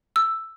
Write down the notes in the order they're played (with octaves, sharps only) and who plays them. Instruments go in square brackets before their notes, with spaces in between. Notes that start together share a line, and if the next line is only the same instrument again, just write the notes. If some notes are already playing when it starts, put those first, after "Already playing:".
[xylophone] E6